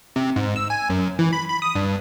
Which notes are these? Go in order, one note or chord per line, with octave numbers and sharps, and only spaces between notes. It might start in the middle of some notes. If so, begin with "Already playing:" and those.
C3
G#2
E6
G#5
F#2
E3
B5
B5
D#6
G2